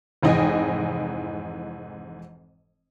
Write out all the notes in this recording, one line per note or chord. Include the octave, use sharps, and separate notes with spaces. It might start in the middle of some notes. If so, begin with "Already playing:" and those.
F1 G#2 E3 D#5 G5 G#5